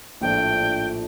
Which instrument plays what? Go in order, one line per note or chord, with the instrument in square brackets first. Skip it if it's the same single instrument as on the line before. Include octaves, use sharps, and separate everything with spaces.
[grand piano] A#1 A2 F3 A3 D4 [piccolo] G5